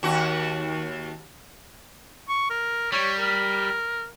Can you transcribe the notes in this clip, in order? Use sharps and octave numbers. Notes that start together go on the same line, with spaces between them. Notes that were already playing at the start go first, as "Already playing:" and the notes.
D#2 F#4
C#6
A#4
G3 C#5
A#4